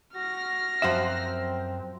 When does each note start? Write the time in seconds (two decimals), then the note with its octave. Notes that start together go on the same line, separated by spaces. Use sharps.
0.15 F#4 F6 A#6
0.82 F#2 F3 C4 F#4 C5 E5